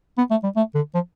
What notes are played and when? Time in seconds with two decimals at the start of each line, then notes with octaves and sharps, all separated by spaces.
0.18 B3
0.31 A3
0.44 G3
0.57 A3
0.75 D3
0.94 F3